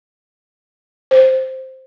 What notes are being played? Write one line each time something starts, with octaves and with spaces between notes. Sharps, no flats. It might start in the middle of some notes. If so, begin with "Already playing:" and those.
C5